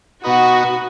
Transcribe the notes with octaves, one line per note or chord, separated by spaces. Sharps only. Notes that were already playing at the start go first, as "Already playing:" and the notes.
B2 B3 D#4 F#4 B4 D#5